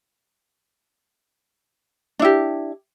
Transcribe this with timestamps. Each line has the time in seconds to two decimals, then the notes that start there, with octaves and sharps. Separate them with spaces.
2.19 D4
2.22 E4
2.25 G4